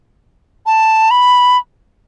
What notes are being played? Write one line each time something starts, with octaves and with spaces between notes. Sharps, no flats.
A5
B5